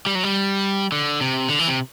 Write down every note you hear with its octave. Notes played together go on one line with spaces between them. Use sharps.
G3
F#3
G3
D3
C3
D3
E3
C3